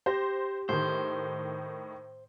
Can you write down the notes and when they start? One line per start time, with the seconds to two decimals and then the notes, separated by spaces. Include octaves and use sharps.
0.06 G4 C5 A#6
0.69 A2 D#3 C5